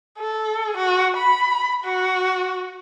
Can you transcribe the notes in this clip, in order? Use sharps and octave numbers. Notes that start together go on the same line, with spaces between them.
A4
F#4
B5
F#4